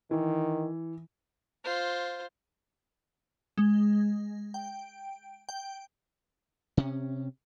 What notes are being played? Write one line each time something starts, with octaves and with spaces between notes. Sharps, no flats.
D#3 E3
F4 C5
G#3
G5
G5
C3 C#4